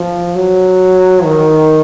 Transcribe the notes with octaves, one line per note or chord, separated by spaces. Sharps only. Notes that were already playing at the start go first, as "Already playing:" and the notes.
Already playing: F3
F#3
D#3